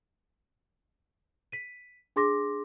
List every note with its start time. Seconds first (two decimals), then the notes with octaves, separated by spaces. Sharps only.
1.52 B6 D#7
2.16 D4 G#4 C6 D6 A#6